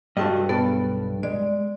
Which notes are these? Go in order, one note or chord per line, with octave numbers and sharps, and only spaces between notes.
G2 F#4 A4 D#5
B1 B3 A4 B4
G#3 D5